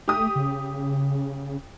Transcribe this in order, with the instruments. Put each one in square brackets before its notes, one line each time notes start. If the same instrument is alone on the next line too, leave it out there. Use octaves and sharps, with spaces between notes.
[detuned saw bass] A3 [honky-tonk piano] G4 D#6
[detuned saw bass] C#3